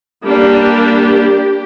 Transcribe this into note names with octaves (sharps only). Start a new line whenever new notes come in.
G3 A#3 D4 G4